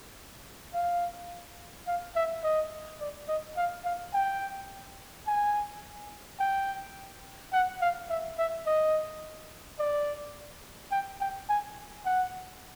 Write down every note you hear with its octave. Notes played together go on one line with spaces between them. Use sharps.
F5
F5
E5
D#5
D5
D#5
F5
F5
G5
G#5
G5
F#5
F5
E5
E5
D#5
D5
G5
G5
G#5
F#5